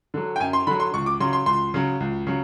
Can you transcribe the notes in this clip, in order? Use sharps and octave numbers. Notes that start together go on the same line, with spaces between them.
D3 F#3
G5
F#2 G#5
C6
D3 F#3 B5
C6
C#2 C#6
D6
C#3 F#3 C6
C6
C#2 C6
C#3 F#3
C#2
C#3 F#3